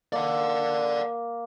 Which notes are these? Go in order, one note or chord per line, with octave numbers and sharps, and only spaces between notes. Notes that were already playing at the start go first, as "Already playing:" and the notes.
A#3 D5 F#5